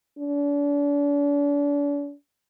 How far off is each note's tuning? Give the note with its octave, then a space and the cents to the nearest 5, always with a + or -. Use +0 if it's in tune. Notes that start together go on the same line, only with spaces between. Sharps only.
D4 -40